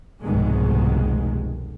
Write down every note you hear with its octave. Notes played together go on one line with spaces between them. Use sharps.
F1 C2 G#2 B2 D#3 G#3